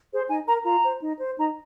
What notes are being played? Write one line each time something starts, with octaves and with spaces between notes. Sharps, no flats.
G#4 C5
D#4 G#5
A#4 A#5
F4 A#5
C5
D#4
C5
D#4 A#5